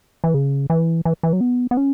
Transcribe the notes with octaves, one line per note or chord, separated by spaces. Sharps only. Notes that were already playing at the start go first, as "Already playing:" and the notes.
E3
C#3
E3
E3
E3
F#3
B3
B3
C#4